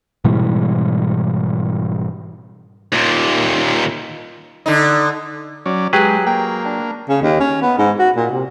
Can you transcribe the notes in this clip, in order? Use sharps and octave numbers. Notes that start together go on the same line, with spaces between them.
G#2 B2 E3 G3
D#2 A#2
D3 D#4
F#3 C#4 D5
F#3 G#3 G4 G#4 B4
A#3 G5
D4
C#3
D#2
C#4
B3
G#2
F#4
A#2
C3